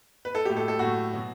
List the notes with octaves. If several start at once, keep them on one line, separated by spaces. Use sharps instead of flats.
B4
A4
A2 F#3 G4
A4
A4
A2 F#3 F#4
B2 F#3